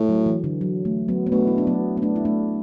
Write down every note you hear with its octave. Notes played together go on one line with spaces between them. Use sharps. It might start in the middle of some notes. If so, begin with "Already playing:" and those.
Already playing: A2
F#3
E3
D3
F#3
A3
F#3 B3
B3
B2 A3 D4
E4
D4
F#3 B3
B3
A3 D4
E4
A3 D4